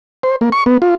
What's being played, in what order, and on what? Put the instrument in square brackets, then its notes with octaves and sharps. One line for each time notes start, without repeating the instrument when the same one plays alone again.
[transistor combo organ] C5
A#3
C#6
B3
F4